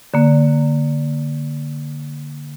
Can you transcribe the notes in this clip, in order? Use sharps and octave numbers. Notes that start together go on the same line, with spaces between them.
D3 A#3